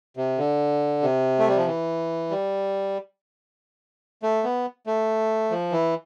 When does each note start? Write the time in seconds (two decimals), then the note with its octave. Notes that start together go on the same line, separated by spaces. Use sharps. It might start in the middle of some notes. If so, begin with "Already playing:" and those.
0.17 C3
0.38 D3
1.03 C3
1.39 A3
1.48 G3
1.57 F3
1.66 E3
2.30 G3
4.23 A3
4.44 B3
4.87 A3
5.51 F3
5.72 E3